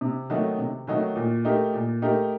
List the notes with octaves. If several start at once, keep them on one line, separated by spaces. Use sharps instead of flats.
C3
D#3 F#3 A3 D#4
C3
D#3 F#3 A3 D#4
A#2
A3 D#4 G4 A#4
A#2
A3 D#4 G4 A#4